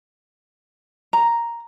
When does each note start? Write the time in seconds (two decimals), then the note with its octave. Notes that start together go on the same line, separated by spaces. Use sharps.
1.13 A#5